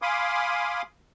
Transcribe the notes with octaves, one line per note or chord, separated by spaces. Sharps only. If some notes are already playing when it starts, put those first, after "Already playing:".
F5 G#5 B5 C6 D6 D#6